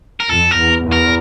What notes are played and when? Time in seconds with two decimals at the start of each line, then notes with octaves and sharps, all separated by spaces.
0.20 A#4
0.29 F2 A4
0.51 A#4
0.57 E2
0.86 E2
0.92 A#4